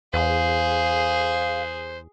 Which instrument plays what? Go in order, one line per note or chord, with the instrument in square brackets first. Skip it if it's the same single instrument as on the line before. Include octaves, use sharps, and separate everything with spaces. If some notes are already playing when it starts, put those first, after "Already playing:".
[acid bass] E2 [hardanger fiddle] G#4 [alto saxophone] C5 [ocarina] F5